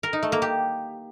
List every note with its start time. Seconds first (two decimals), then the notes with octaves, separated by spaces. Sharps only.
0.03 A#4
0.13 D#4
0.23 A3
0.32 A#3
0.42 G4